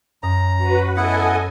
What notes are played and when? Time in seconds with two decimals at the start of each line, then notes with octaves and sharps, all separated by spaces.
0.23 F#2 A#5 D#6
0.57 F#4 B4
0.96 B3 E4 A4 D#5 F#5 G#5